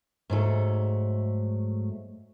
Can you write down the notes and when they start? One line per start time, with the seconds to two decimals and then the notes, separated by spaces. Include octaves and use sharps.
0.30 G#2 F#3 A3